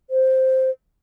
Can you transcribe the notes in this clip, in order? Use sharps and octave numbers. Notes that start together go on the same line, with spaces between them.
C5